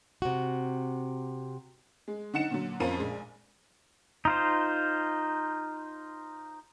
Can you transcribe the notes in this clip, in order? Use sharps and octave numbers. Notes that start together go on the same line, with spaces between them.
C3 F#4
G#3
D3 D#4 F#5 C#7 E7
A#2 D3 F#3
F2 F3 C#4 A#4 F5 D#7
A#1 G#3
D#4 F4 C5